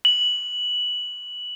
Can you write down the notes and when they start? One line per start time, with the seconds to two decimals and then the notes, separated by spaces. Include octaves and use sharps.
0.05 F#7